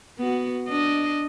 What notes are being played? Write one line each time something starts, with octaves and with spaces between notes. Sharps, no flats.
B3 F#4
D4 D#5